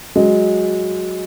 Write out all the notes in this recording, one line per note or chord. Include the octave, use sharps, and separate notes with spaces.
F#3 G#3